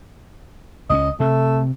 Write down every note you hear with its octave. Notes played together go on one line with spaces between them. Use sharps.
C#2 C4 C#4 D#5
C3 A3